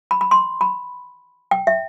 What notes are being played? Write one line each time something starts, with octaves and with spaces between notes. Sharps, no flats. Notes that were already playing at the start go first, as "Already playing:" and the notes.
B5
B5
C6
B5
G5
E5